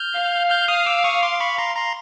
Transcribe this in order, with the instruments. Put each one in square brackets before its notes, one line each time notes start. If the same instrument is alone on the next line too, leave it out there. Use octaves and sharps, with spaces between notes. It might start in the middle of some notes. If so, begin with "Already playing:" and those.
Already playing: [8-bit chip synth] F6 G6
[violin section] F5
[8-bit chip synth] F6 G6
D#6 F6
D6 E6
C#6 D#6
C6 D6
B5 C#6
A#5 C6
A#5 C6